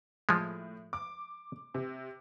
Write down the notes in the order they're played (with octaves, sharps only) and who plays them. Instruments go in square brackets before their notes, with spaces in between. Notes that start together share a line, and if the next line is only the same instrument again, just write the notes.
[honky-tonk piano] A2 [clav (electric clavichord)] F3 G#3
[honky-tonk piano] D6
C3